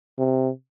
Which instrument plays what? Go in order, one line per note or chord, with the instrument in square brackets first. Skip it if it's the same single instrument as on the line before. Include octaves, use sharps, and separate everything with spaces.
[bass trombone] C3